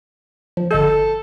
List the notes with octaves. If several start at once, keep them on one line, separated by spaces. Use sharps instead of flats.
F3
G1 A4 D#5 G6